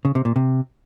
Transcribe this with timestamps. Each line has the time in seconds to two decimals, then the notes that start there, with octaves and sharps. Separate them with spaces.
0.05 C#3
0.15 C3
0.25 A#2
0.36 C3